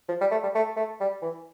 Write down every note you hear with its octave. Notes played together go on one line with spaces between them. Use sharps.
F3
G3
A3
G3
A3
A3
G3
E3